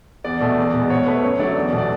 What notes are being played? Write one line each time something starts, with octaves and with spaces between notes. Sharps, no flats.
E2 D5
B2 A3
E2
B2 G#3
B2 C#5
A3 B4
F#2 C#5
D3 F#3 A3 D5
E2
B2 F#3 A3
D5